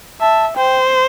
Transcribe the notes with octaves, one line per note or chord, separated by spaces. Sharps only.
E5 A5
C5 G5